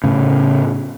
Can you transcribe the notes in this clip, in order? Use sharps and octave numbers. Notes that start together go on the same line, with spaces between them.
A2 C#3